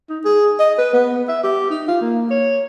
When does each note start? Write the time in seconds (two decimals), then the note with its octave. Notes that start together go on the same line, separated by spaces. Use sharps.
0.09 D#4
0.25 G#4
0.59 D#5
0.78 B4
0.93 B3
1.28 E5
1.44 G4
1.70 D#4
1.88 F4
2.01 A#3
2.31 C#5